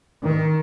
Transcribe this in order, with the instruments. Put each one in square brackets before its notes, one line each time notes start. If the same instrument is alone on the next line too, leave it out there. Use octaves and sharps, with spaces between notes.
[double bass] D#3